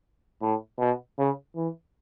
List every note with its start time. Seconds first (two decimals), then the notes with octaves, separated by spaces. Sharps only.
0.42 A2
0.79 B2
1.18 C#3
1.56 E3